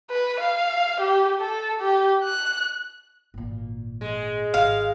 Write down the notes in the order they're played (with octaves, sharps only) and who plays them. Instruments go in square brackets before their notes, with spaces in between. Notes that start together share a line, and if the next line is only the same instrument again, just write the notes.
[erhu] B4
F5
G4
A4
G4
F#6
[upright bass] G#1 A#2
[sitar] G#3
[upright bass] G#1 [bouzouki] F5